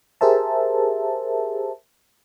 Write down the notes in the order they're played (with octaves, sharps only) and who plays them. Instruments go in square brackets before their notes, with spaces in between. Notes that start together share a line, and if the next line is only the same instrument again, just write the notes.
[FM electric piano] G4 G#4 A#4 C5 E5 A5